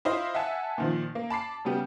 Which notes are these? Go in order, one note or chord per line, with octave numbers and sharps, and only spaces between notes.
E4 F4 C5 D#5 F5
E5 F#5 G#5 A5 E6
A#2 D#3 F3
A#3
A5 B5 D6 C7
C#3 G3 B3 G4